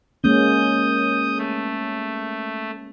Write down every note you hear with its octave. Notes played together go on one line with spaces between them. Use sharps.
G#3 A#3 C#4 D#6 G6
A3